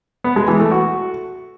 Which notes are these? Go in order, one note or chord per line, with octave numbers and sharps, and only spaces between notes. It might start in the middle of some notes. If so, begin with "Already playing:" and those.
B3
G#3
E3
A3
F#4